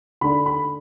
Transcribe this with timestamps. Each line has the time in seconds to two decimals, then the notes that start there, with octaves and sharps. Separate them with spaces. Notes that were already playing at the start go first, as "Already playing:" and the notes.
0.21 D3 A3 D4 B5
0.46 B5